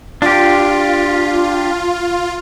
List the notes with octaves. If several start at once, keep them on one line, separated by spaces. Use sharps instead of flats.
D4 F4 G4